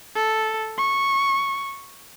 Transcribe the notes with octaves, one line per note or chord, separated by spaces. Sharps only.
A4
C#6